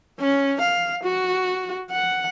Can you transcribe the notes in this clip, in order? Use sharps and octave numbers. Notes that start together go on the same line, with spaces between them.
C#4
F5
F#4
F#5